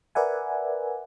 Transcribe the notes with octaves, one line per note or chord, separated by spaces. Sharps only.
A#4 B4 D5 E5 F#5 G#5